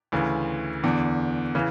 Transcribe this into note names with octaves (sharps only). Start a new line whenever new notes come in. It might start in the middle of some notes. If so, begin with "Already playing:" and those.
D2 C#3 E3
E2 D3
C#3 E3